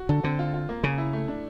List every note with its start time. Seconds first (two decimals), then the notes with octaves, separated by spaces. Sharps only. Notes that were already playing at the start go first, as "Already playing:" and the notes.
Already playing: F#4
0.09 D3 A4
0.24 D3 C4
0.39 F4
0.54 F4
0.69 A#3
0.84 C#3 C#4
0.98 E4
1.13 A3
1.28 D4